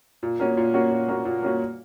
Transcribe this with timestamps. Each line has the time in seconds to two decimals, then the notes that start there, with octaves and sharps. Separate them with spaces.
0.23 A#2
0.40 A#3 C#4 F#4
0.57 A#2
0.74 A#3 C#4 F#4
0.91 A#2
1.09 A#3 C#4 F#4
1.25 A#2
1.43 A#3 C#4 F#4